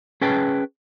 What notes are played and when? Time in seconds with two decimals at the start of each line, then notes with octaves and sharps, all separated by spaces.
0.21 C#4 G#4 B4 G5 A5